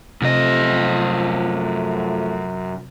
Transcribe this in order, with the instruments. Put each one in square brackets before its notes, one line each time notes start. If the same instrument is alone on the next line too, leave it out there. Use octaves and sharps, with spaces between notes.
[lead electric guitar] F#2 D#5 [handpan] C3 [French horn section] F3 A3